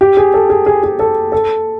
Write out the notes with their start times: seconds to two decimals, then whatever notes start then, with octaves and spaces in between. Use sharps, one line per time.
0.01 G4
0.17 G#4
0.34 A4
0.50 G#4
0.66 G#4
0.83 G#4
0.99 A4
1.32 A4